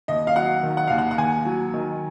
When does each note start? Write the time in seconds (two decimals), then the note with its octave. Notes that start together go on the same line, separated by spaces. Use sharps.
0.08 D#2 D#5
0.27 F5
0.35 F#3 F#5
0.63 D#3
0.77 F#5
0.87 D#2 F5
0.98 F#5
1.11 F#5
1.18 D#2 G#5
1.45 F#3
1.74 D#3